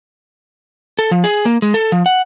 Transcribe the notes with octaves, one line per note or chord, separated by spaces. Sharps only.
A4
F3
G#4
A#3
G#3
A4
F3
F#5